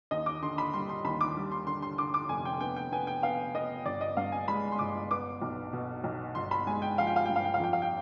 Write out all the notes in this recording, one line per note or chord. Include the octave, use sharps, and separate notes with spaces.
D#2 D#5
D6
D3 C6
B5
G3 C6
C6
D#2 B5
D6
G3
C6
D3 C6
C6
D3 D6
D6
F1 G#5
G5
B3 G5
G5
B3 G#5
G5
B3 F5
B3 D#5
G1 D5
D#5
G2 F5
G#5
G#3 B5
C6
G1 D6
B3 D6
B1
B2
B1
G1 C6
B5
G#3 G#5
G5
F3 F5
G5
F5
G2 G5
F5
G5
F5
F2 G5
F5
G5